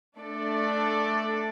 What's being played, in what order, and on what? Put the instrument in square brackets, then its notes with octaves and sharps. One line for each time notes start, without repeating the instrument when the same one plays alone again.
[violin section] A3 D4 A4 D5